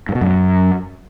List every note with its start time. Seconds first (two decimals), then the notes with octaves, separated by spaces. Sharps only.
0.09 G2
0.15 B2
0.21 F#2